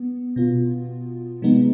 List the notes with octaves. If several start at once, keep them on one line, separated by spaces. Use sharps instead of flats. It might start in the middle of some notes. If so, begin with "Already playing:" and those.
Already playing: B3
B2 B3 F4
C3 F3 G#3 B3 D#4